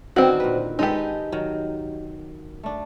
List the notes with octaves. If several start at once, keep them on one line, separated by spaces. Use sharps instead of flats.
D3 D#3 B3 C4 F#4
A#2 B4
G#3 D#4 G4 A4 B4
D#3 F#3
A3 D4